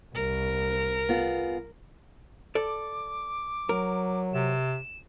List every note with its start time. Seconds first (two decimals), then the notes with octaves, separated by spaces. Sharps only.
0.14 C2 A#4
1.09 B3 F4 G#4
2.55 A4 D5 D6
3.69 F#3 A#4
4.34 C3 E7